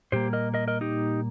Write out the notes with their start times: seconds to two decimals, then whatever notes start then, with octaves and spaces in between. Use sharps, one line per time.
0.12 A#2 G3 A#3 G4 C5
0.33 A#4 D#5
0.54 A#4 D#5
0.68 A#4 D#5
0.81 D#4 G4